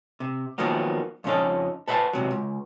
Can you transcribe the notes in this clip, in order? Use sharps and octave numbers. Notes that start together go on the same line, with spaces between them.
C3
D#3 F3 F#3 A#3 B3
F2 C#3 F3 C#4 D#4 A4
A4 B4 C5 D5 F#5 A5
E2 C3 F#3
C#2